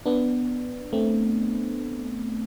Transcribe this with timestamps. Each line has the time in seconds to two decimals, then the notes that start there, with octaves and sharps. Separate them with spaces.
0.06 B3 D4
0.93 A3 C4